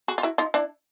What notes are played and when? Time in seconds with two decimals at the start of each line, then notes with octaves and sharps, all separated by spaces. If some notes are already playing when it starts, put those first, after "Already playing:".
0.08 F#4 G#4
0.18 F4
0.23 E4 F#4
0.38 D#4 F4
0.54 D4 E4